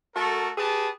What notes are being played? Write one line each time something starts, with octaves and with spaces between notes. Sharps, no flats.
A3 F#4 A4 A#4
G4 G#4 B4 A5